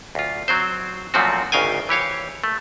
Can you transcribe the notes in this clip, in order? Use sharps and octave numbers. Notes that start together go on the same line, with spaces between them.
D2 F4
F#3 C4 C5
F#2 A#2 F3 A3 C4 F#4
G#1 D2 C#3 F5 G5 G#5
E3 G4 C#5 F5
A3